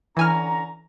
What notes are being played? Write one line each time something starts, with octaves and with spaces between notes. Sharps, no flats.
D3 E3 C#4 G#5 A#5 F6